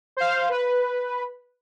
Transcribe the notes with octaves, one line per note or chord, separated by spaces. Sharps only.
C5 F5
B4